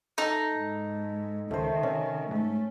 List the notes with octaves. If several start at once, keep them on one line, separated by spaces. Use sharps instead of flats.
D#4 A4 A#5
G#2
C#2 D#3 A3 C5
C3 C#4
G#2 A3